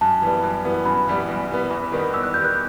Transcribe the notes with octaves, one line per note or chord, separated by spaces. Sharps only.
F#2 A5
E3 G3 B3
F#2
E3 G3 B3
F#2 B5
E3 G3 B3
F#2
E3 G3 B3
E2 B5
D#3 G3 B3
E2 E6
F#6
D#3 G3 B3 G6
F#6